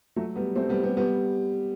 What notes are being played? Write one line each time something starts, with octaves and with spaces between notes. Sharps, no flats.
F#3 A3
G3 B3
A3 C4
G3 B3
G3 B3
G3 B3